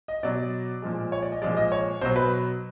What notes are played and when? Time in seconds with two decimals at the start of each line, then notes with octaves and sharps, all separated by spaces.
0.08 D#5
0.23 B2 F#3 D5
0.82 A#2 F3 G#3
1.12 C#5
1.22 D5
1.32 D#5
1.42 A#2 F3 G#3 D5
1.57 D#5
1.72 C#5
2.01 B2 F#3 C5
2.16 B4